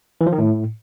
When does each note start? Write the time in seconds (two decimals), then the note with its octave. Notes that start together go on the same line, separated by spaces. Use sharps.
0.21 E3
0.26 F3
0.32 D#3
0.38 A2